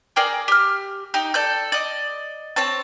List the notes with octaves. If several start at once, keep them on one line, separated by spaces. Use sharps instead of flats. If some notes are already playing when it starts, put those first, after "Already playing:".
G#4 A#4 D5 G5
G4 F6
D#4 G4
A4 D5 G6
D5 D#5
C4 C#5 A5